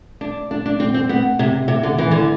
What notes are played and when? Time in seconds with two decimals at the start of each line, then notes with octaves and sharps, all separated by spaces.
0.21 D4
0.51 D4
0.66 D4
0.80 C4
0.94 C4
1.09 B3
1.39 C3
1.68 C3
1.83 D3
1.98 E3
2.11 D3